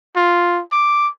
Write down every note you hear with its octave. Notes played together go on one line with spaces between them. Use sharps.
F4
D6